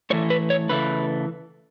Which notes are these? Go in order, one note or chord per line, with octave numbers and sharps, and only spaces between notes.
A2 E3 A3 C#5
B4
C#5
C#3 E3 A3 B4